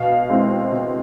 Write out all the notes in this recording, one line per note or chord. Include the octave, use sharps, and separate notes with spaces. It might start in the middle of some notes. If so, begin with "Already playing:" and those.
Already playing: B2 F5
G#3 C4 E4
B2